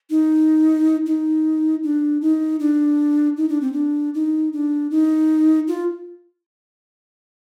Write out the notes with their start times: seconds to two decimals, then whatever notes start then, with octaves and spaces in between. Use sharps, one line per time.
0.10 D#4
1.06 D#4
1.83 D4
2.21 D#4
2.60 D4
3.37 D#4
3.49 D4
3.61 C4
3.73 D4
4.14 D#4
4.53 D4
4.91 D#4
5.68 F4